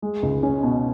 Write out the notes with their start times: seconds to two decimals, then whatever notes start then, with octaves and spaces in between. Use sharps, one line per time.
0.02 G#3
0.23 C#2
0.43 C#4
0.63 B2